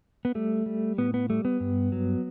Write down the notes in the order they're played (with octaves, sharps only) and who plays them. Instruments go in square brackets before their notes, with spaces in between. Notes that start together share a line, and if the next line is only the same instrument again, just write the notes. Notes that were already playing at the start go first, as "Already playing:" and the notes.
[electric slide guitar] B3
G3 A3
G3
A2 B3
B3
G3 A3
B3
G2
F#3